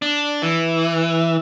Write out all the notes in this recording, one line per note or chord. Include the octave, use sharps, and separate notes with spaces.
D4
E3